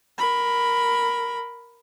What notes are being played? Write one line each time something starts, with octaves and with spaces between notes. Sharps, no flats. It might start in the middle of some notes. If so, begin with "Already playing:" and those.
A#4 B5